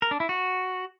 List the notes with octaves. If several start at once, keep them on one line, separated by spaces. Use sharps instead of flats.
A#4
D4
E4
F#4